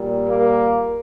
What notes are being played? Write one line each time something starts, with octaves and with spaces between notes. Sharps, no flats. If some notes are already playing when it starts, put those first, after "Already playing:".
Already playing: A#2 G3
A#3